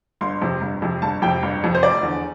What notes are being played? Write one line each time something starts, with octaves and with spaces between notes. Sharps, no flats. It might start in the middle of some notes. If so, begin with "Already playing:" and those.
G1 C6
F2 C3
G1
F2 C3
G1 A5
F2 C3 G5
G1
F2 C3
C5
F1 D5
E2 D3